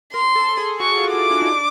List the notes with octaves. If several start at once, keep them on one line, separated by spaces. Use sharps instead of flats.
A#4 C6
A4
G#4
F#4 C#6
F4
E4 D6
D4
D#4
D4